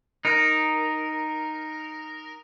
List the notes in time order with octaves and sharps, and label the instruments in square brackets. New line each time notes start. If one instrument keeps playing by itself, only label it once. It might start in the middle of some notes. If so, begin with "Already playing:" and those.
[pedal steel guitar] D#4 A#4